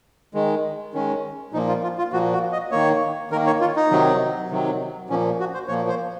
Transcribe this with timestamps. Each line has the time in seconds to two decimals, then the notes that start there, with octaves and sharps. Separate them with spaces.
0.34 D#3 G#3
0.94 D#3 G#3 C#4
1.53 A#2 F3 A#3 D#4
1.68 F4
1.83 F4
1.98 F4
2.13 A#2 F3 A#3 F#4
2.33 F#4
2.52 D#5
2.71 D#3 A#3 C#5
3.31 D#3 A#4
3.35 A#3
3.47 C#5
3.61 F4
3.76 D#4
3.91 C3 D#3 F#3
4.50 C3 D#3 F#3
5.10 A#2 F3 A#3 C#4
5.40 F#4
5.54 C5
5.68 A#2 F3 A#3 C#5
5.89 C5